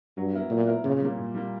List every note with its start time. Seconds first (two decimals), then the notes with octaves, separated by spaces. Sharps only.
0.17 G2 F#3
0.34 B3 E4 A#4
0.50 A#2 F#3
0.67 B3 E4 A#4
0.84 A#2 C#3
1.01 G3 A#3
1.18 A#2
1.35 G3 A#3